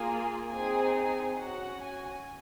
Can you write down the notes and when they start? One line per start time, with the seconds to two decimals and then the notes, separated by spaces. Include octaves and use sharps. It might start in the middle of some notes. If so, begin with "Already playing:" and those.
Already playing: A#3 F4 G#4 G#5
0.54 C4 D#4 G#4 G#5
0.97 G#5
1.38 C#4 F#4 F#5
1.80 G#5